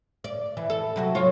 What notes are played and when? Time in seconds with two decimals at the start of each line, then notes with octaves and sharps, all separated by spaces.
0.24 D5
0.57 E3
0.70 A4
0.96 C3 F#3 F#4
1.15 F#3 F4 C#5